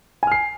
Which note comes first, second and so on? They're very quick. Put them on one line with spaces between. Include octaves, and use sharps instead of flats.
G#5 F6 C7